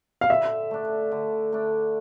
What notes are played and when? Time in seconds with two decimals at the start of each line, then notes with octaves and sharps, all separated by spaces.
0.21 F5
0.30 D3 E5
0.71 A3 D4
1.12 D3
1.52 A3 D4